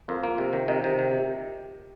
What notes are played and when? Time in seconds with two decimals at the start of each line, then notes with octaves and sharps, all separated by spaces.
0.08 F2 F4 A#4
0.23 A#3
0.38 C3
0.53 D#3
0.68 C3 A#4 D#5
0.84 C3
0.99 D#3
1.12 G4